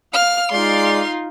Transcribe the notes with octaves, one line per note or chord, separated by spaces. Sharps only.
F5 F6
G#3 D#4 F4 D5 F5 C6